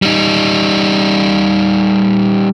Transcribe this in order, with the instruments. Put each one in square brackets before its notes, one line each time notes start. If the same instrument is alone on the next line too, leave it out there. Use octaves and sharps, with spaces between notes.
[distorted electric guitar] G3 D#4